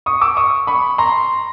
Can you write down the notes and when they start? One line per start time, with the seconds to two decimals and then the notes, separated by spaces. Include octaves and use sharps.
0.06 C#6 D#6
0.22 D6 E6
0.37 C#6 D#6
0.67 B5 C#6
0.98 A#5 C6